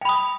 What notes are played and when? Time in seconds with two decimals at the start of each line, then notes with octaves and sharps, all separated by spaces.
0.01 G5
0.05 B5
0.09 D#6